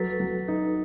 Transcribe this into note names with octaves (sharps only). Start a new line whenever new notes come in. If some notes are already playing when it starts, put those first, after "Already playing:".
Already playing: F#3 A4 B4
F#3
D#4